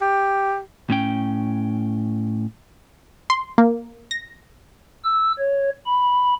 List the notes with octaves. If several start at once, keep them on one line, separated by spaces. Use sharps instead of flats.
G4
A2 C#4 G5
C6
A#3
A#6
E6
C#5
B5